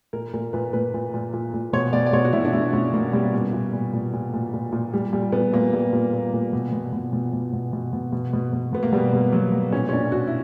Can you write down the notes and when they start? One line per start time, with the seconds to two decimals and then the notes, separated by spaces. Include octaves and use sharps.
0.13 A#2 A#4
0.33 A#2 A#4
0.53 A#2 B4
0.73 A#2 B4
0.94 A#2
1.14 A#2
1.33 A#2
1.54 A#2
1.73 B2 C#5
1.93 B2 D5
2.06 D5
2.13 B2 C#5
2.25 F#4
2.33 B2 E4
2.45 D4
2.53 B2 E4
2.73 B2 C#4
2.94 B2 A#3
3.13 B2 G3
3.33 A#2
3.53 A#2
3.73 A#2
3.93 A#2
4.13 A#2
4.34 A#2
4.54 A#2
4.72 A#2
4.93 A#2 G3
5.13 A#2 G3
5.32 A#2 B3
5.53 A#2 A#3
5.73 A#2 G3
5.93 A#2
6.13 A#2
6.33 A#2
6.53 B2
6.73 B2
6.92 B2
7.13 B2
7.33 B2
7.53 B2
7.73 B2
7.93 B2
8.12 B2
8.33 B2
8.53 B2
8.73 B2 B3
8.83 A#3
8.93 B2 G3
9.13 B2
9.32 B2 F#3
9.52 B2
9.72 A#2 C#4
9.89 C#4
9.93 A#2 D4
10.12 A#2 F#4
10.27 E4